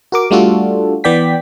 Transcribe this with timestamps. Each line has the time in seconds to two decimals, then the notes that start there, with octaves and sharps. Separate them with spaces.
0.12 F#4 A#4 D6
0.31 G3 A3 D4 F4 F#4 A4
1.04 E3 B3 D5 G5 B6